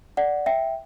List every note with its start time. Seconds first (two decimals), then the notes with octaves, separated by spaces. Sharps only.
0.17 D5 F#5
0.46 E5 G5